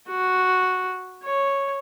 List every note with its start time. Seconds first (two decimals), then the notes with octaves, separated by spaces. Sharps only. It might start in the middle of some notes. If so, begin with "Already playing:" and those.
0.10 F#4
1.24 C#5